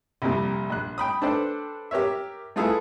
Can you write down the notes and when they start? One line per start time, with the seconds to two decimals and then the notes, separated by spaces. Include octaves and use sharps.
0.22 C2 F2 A#2 G3
0.70 A#1 F#6
0.98 G5 B5 D#6
1.22 D4 A4 B4 C5 D5 G5
1.91 G4 A#4 C#5 E5
2.56 A3 E4 F4 G#4 A4 B4